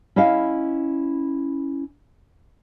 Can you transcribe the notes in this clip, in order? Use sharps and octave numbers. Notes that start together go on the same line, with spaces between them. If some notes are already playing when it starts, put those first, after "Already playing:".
C#4 E4 D#5 F5